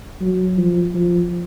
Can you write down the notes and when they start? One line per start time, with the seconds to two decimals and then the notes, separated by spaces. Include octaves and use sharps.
0.21 F#3
0.57 F3
0.94 F3